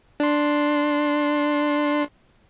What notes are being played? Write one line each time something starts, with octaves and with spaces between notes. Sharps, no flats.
D4 C6